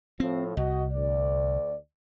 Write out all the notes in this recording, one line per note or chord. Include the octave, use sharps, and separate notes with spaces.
A2 F3 C4
C2 F#4 D#5
D2 D5